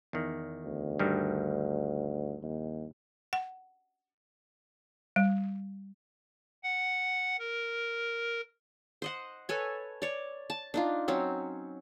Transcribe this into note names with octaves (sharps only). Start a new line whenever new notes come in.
E2 D#3
D2
G2 D#3 G3
D#2
F#5
G3
F#5
A#4
C5 D#5 F#5
A4 B4 C#5 G#5
C#5 D5
A5
D4 D#4 F4
F#3 C4 C#4